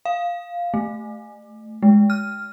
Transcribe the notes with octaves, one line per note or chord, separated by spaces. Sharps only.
F5
A3
G#3
F6